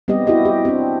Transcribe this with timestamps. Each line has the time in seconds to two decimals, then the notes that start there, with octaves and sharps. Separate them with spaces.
0.08 G3 B3 C4 G4 D#5
0.27 E4 F#4 G4 D#5
0.45 G4
0.65 C4 D4